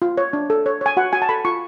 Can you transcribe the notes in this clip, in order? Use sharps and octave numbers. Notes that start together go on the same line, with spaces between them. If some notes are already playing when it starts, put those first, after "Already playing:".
F4
C#5
D4
A4
C#5
C#5 G#5
F#4 F#5
F#4 G#5
A5
A4 B5
F4 C#6